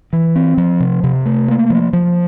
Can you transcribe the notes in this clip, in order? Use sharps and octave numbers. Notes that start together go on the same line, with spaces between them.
E3
C4
F3
C3
C3
A3
A#3
F3
F3